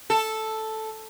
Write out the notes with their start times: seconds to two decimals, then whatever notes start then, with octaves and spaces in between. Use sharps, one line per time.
0.10 A4